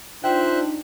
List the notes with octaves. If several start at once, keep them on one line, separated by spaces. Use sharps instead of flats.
D4 D#4 F4 C5 E5 G5 F#6